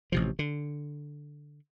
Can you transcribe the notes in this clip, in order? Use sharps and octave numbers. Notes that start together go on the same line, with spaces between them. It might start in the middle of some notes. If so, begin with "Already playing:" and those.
A1 C3 F3
D3